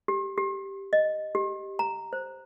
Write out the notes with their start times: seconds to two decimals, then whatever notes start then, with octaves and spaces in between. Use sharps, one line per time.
0.08 G4
0.38 G4
0.93 D#5
1.35 G4
1.79 A#5
2.13 C5